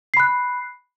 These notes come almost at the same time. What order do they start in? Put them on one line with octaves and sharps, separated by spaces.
C7 B5 F#6